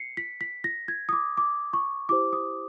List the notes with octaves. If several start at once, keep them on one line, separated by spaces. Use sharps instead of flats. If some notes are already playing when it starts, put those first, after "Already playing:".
Already playing: C7 C#7
B6
B6
A#6
G#6
D#6
D6
D6
C#6
E4 G4 C5 D6
D#6